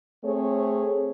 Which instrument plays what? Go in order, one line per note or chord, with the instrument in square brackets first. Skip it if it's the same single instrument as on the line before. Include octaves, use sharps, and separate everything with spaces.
[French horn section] A3 C4 G#4 C#5